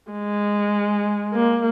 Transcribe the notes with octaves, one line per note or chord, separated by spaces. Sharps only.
G#3
A#3